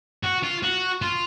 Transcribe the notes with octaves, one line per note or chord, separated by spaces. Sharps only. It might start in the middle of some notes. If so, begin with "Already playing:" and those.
F#4
F4
F#4
F4